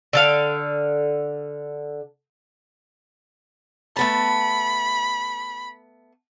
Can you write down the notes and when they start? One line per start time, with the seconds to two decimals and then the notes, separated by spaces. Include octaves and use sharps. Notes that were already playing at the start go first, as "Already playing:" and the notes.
0.13 D3 A4 F5
3.96 A3 B3 A5 B5